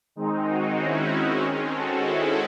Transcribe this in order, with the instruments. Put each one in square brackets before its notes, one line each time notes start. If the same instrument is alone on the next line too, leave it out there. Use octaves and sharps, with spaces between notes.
[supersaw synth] D#3 G#3 C4 D#4
D#4 F#4
C#4 E4
D#3 G#3 C4 C#4
F#4 A4
E4 G#4